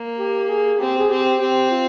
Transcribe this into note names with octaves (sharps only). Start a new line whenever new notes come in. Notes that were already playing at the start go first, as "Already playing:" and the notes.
Already playing: A#3
G4
G#4
C4 G4
G#4
C4 G4
C4 G4
F4